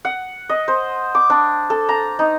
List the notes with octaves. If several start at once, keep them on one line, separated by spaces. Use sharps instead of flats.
F#5
D#5
C5
D6
D4
A4
A#5
D#4